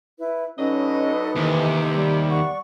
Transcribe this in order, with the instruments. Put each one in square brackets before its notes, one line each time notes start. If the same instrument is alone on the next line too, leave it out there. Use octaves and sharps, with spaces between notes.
[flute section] E4 B4
[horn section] D3 F#3 D#5 [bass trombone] C#4 [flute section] D#4 A4 B4
[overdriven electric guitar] D#2 [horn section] C3 [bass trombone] E3
[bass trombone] G3
[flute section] D5 F#5 C#6